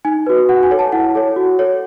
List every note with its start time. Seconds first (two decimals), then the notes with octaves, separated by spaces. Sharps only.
0.05 D#4 G#5
0.27 F#4 B4
0.49 F#4 F#5
0.63 G#5
0.71 A4 C#5
0.79 A5
0.92 E4 F#5
1.15 A4 C#5
1.36 F#4
1.59 A4 C#5